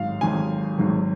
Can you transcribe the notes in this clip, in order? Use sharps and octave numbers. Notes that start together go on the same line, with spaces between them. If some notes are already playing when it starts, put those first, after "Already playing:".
Already playing: G#1 G#2 F#3 F5
G#1 G#2 F#3 G#5
G#1 G#2 F#3